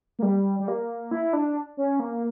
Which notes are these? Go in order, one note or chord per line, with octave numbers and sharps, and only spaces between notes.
A#3
G3
G3
A#3
E4
D4
C#4
A#3